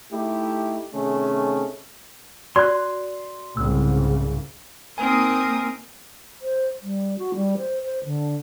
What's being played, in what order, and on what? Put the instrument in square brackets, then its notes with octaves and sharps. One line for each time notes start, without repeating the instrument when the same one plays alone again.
[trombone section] A3 D#4 E4 G4
C3 D#3 A3 C#4 G#4
[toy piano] F#4 D5 [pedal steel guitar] C6 F#6
[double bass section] C2 G#2 C#3 [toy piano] E6
[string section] A#3 D#4 D#6 [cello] C4 A#4 [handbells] G#5
[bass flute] C5
G3
F#4
G3
C5
C5
D3